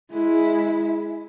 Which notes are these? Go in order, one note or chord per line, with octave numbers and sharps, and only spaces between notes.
G#3 E4